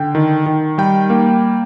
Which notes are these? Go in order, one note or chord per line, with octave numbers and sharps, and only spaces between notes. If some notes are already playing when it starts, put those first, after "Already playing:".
Already playing: D3 G5
D#3
D#3
G3 G5
A#3